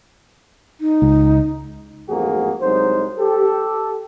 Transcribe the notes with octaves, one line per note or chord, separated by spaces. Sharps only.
D#4
C#2
A1 F2 G#2 A#3 F#4 G#4
C2 F#3 G#3 D#4 C5
G4 A4